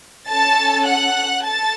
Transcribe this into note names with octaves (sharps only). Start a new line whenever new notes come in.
C#4 A4 A5 A6
F#5 F#6
A4 A5 A6